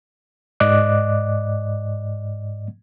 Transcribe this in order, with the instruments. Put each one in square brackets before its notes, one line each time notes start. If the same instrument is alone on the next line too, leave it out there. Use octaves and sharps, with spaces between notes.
[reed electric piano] G#2 D5 D#5 D6 F#6